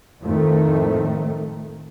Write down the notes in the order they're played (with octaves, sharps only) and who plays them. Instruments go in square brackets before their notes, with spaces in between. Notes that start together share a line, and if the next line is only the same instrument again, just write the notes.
[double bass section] F2 A2 D#3 A3